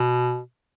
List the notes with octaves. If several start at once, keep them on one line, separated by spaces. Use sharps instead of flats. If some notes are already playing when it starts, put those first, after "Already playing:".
Already playing: B2